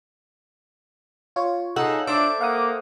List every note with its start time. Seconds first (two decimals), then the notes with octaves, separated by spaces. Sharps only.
1.36 F4 C#5
1.76 D#4 G#4 A4 F#5
2.07 D4 A4 C5 E5 D6
2.41 A#3 F5 F#5 D#6